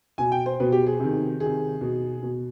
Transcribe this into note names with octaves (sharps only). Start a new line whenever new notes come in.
B2 G#5
G5
C5
B2 B4
G4
G#4
C3 D#3
C3 D#3 G#4
B2
B2